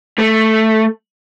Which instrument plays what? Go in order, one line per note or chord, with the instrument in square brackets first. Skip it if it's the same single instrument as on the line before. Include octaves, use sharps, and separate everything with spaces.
[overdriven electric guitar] A3